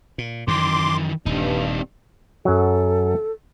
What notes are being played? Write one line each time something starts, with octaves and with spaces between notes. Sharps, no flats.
A#2
F#2 D#3 E3 C6 D6
D#1 G2 C4 D#4
F#2 F#3 A4